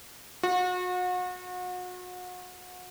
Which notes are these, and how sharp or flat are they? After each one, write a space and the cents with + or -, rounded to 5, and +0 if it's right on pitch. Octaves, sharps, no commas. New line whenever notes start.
F#4 -35